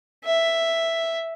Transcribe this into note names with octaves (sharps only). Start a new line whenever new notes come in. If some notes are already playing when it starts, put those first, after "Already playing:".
E5